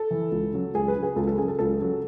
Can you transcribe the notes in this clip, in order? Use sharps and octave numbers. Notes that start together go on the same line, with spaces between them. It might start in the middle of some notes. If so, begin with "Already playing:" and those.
Already playing: A4
E3
C#2
C#3 F#3
C#2 G#4
B4
C#3 F#3
G#4
C#2 A4
A4
C#3 F#3 G#4
A4
C#2 A4
C#3 F#3